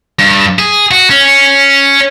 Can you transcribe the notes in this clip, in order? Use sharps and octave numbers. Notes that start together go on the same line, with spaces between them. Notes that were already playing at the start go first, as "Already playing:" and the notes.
G2
G#4
F#4
C#4